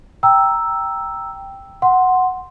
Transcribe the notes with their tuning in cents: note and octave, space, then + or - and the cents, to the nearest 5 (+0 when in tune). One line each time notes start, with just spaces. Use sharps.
G5 +0 A#5 +0 E6 +0
F#5 +0 C6 +0